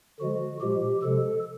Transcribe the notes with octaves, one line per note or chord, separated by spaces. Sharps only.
D3 F3 G#3 F#4
A#2 F3 G#3 G4
C3 F3 G#3 A4